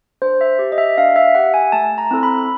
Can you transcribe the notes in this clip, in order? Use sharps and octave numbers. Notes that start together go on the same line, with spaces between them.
D4 C5
E5
G4
D#5
E5
D4 F5
E5
G4 F#5
G#5
A3 A5
A#5
C4 E4 A4
B5